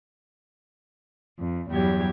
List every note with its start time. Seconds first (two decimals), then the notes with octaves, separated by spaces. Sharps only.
1.38 F2
1.70 E2 G2 F#3 G3 G4 G#6